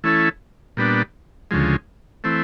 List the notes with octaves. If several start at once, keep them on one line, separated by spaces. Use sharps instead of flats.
E3 A3 C#4 E4 A4
A#2 G3 B3 D4
D2 C#3 F3 G#3
E3 A3 C4